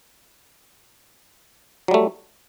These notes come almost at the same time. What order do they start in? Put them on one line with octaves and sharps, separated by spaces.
F#3 G3 A3